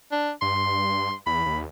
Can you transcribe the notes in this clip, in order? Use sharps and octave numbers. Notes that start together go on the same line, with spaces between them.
D4
G2 C6
E2 B5
D#2